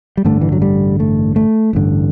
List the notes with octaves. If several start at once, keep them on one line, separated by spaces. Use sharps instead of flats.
G3
A1 G2 D3 A3
E3
F#3
G3
A3
A3
A1 G2 D3